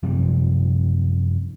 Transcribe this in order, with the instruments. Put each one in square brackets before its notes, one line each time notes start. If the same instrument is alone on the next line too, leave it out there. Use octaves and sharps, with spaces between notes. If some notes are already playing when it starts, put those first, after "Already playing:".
[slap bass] F#2 C3 F3 G3